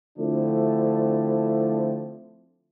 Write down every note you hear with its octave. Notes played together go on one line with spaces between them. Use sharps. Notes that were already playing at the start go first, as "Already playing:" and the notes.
D3 F3 A3 C4 D4 E4